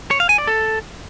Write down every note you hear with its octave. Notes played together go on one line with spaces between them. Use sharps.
C#5
F5
G#5
D5
A4